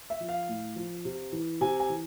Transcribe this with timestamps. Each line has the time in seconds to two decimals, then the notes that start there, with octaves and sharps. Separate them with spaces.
0.10 E5
0.20 F3
0.29 F5
0.48 A2
0.76 F3
1.05 C3
1.32 E3
1.61 C3 G#5
1.80 G#5
1.89 E3